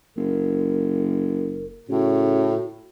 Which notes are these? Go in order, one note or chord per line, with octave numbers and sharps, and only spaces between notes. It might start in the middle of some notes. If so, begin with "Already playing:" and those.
F#1 A#4
A2 C#3 F#4